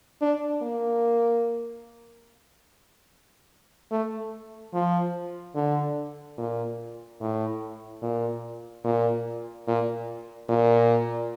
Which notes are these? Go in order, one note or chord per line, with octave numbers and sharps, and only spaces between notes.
D4
A#3
A3
F3
D3
A#2
A2
A#2
A#2
A#2
A#2